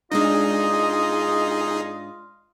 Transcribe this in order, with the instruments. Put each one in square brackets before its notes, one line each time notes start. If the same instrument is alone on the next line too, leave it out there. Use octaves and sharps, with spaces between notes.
[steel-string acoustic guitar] G#2 G#3 D4 [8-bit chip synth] D#4 G#4 [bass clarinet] F4 [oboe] D#5